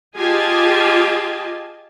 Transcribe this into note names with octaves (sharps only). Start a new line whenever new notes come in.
F4 G4 G#4 D#5 G#5 A5